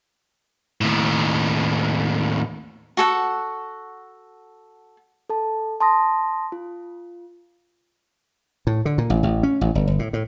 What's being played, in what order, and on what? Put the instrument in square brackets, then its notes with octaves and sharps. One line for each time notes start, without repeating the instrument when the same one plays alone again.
[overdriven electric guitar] D#2 A2
[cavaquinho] F#4 A4 F#5
[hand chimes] A4 A5
A5 C6 D#6 A#6
F4
[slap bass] A2
D3
A#2
A1
A1
C#4
A1
G1
G1
A2
A2